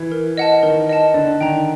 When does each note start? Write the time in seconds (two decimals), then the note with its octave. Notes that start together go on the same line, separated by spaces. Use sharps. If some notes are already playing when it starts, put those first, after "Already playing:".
Already playing: E3
0.12 A#4
0.37 D#5 F#5 A5
0.63 D#3 A#4
0.89 D#5 F#5 A5
1.14 D3 D5
1.41 D#3 G5 A#5